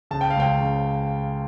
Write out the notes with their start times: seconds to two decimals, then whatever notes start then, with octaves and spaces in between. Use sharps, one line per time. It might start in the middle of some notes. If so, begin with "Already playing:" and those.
0.11 C#3 A5
0.21 G5
0.30 F5
0.36 C#2 G5
0.61 C#3